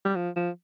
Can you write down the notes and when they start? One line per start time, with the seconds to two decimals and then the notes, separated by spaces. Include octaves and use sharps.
0.05 G3
0.16 F3
0.36 F3